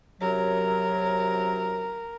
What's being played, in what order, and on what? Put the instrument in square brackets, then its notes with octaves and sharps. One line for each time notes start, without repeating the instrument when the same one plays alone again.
[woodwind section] F#2 C3 F#3 [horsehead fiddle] A#4